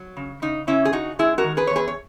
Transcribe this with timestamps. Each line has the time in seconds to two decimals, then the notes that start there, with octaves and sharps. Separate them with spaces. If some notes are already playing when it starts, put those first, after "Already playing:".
Already playing: F#3
0.17 C#3
0.42 C#3 D#4
0.67 C#3 C#4 E4
0.85 G#4
0.93 C#3 D#4 F#4
1.19 G#3 E4 G#4
1.38 F#4 A#4
1.44 D#3
1.57 G#4 B4
1.67 E2 C#5
1.76 G#4 B4
1.88 C#5